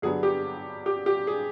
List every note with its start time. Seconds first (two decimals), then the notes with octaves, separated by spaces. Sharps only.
0.02 G2 D3 F#3 B3 G#4
0.23 G4
0.86 G4
1.06 G4
1.27 G#4